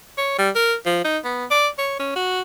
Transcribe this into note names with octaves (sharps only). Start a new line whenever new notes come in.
C#5
G3
A#4
F3
D#4
B3
D5
C#5
C#4
F#4